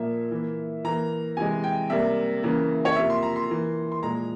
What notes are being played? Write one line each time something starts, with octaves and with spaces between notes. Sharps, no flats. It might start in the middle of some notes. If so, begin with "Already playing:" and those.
Already playing: A#2 F3 A#3 E5
E3 A#3
E3 A#3 A#5
C3 E3 G#3 G#5
G5
C3 G3 A#3 E5
C#3 E3 A#3
C#5
C3 F3 A#3 E5
C6
A#5
C6
E3 A#3
C6
A#2 F3 G#3 A#5